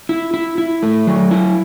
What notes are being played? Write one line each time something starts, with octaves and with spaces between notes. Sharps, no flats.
E4
E4
E4
A3
F#3
E4